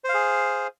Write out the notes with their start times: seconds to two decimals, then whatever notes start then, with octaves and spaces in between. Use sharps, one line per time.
0.04 C5
0.09 F5
0.14 G#4